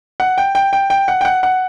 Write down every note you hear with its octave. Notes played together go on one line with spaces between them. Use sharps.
F#5
G5
G5
G5
G5
F#5
G5
F#5
F#5